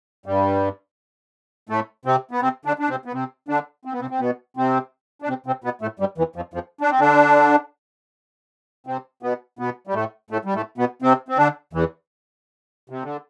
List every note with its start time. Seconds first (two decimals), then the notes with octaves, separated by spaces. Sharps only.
0.26 G2 G3
1.69 A2 A3
2.05 C3 C4
2.31 B3
2.41 C3 C4
2.65 D3 D4
2.79 D4
2.89 C3 C4
3.05 B3
3.13 C3 C4
3.48 D3 D4
3.85 C4
3.92 B3
4.00 C3 C4
4.10 C4
4.20 B2 B3
4.57 C3 C4
5.22 D4
5.28 C3 C4
5.46 C3 C4
5.64 B2 B3
5.81 A2 A3
5.99 G2 G3
6.18 E2 E3
6.36 F2 F3
6.54 F2 F3
6.81 D4
6.91 C4
7.00 D3 D4
8.87 C3 C4
9.23 B2 B3
9.59 B2 B3
9.87 G3
9.94 A2 A3
10.30 A2 A3
10.45 G3
10.55 A2 A3
10.78 B2 B3
11.02 C3 C4
11.29 C4
11.37 D3 D4
11.73 E2 E3
12.90 C3
13.03 D3